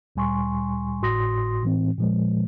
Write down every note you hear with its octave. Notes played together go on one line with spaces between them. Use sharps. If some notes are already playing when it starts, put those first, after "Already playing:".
D2 A#2 G3 G#5 C6 C#6
G#1 A2 F#4 C6 D#6 A#6
A2 E3 C4
A#2 F3 G#3